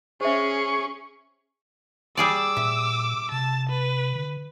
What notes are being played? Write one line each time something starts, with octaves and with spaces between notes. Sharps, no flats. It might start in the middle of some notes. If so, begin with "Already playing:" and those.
C#4 G#4 C5 E5 C#6
G3 G#4 D5 D6 E6
A#2 E5
C3 A5
B4
D3